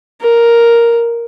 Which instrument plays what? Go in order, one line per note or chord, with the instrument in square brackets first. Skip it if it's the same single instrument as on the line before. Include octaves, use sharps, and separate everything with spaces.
[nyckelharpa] A#4